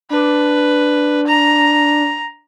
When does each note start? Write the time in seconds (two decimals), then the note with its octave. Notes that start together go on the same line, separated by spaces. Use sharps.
0.10 D4 B4
1.27 A#5